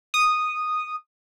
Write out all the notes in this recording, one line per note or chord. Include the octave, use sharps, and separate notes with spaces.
D#6